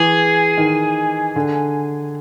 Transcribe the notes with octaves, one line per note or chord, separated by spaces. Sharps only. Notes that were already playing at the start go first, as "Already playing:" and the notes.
Already playing: E3 G#4
D#3
D3